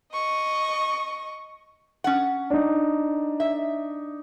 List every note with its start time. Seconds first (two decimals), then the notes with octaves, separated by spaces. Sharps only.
0.12 D#5 C#6
2.04 C#4 F#5
2.50 D4 D#4
3.40 E5